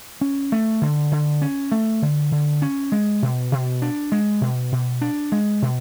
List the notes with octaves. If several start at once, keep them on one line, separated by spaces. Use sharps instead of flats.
C#4
A3
D3
D3
C#4
A3
D3
D3
C#4
G#3
B2
B2
D4
G#3
B2
B2
D4
G#3
B2